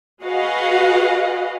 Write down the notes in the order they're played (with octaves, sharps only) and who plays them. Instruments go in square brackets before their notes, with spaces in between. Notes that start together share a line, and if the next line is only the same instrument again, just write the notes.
[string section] F#4 G#4 B4 D#5 F5 F#5